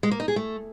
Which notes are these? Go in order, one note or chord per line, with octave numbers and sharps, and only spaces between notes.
G#3
A#3
D#4
G#4
A3